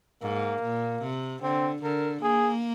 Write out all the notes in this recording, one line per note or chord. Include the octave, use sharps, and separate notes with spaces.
G#2 A#3
A#2
C3
D3 C4
D3 A#4
A#3 G#4